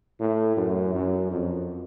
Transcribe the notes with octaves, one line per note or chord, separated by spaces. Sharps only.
A2
F#2
F#2
F2